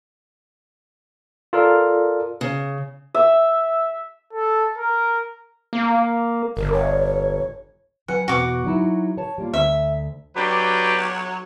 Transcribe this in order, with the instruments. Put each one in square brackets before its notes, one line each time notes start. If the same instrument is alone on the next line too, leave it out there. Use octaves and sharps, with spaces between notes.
[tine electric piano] F4 A4 A#4 D5
[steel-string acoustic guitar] C#3
[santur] E5
[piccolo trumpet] A4
A#4
[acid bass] A#3
[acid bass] G1 [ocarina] A#4
[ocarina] C#5
[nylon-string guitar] F#3 B4 G#5 [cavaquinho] F#5
[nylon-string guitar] E2 B2 B3 [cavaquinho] F#4 D6
[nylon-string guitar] F#3 D#4 E4
C#5 A5
G3 A#3 F4
[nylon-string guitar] D2 [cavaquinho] E5
[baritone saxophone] F#3 [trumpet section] D4 G4 B4